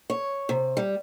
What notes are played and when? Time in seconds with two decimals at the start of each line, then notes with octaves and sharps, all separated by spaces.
0.10 C#5
0.49 C3
0.77 G3